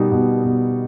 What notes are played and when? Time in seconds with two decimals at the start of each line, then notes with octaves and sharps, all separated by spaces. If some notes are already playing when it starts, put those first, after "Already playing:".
Already playing: B2 G3 D#4
0.12 B2
0.44 B2